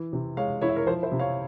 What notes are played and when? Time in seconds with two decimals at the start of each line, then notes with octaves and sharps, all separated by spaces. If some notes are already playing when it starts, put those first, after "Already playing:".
Already playing: E3
0.13 C3
0.37 G#3 C#5 F5
0.62 E4 C#5
0.69 E5
0.76 A#4 C#5
0.87 F3 C5
1.03 C5 E5
1.12 C3
1.19 C#5 F5